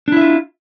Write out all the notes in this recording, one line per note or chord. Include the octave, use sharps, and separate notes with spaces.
D4 E4 F4 E5